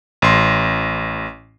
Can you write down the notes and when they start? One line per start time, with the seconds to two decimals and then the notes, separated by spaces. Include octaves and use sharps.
0.22 A1 C6